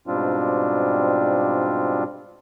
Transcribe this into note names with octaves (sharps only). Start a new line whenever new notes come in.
G#2 B2 G3 C4 D4 F4